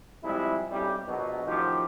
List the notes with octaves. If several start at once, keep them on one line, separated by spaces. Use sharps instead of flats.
C3 F3 G3 G#3 E4
B1 C3 G3 C4 C#4 G4
A#1 B2 F#3
A1 D#3 F3 F#3 F#4 G4